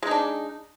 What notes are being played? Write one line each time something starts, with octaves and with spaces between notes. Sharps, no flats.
G#3 D4 D#4